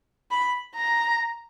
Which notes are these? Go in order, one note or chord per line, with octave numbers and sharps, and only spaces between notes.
B5
A#5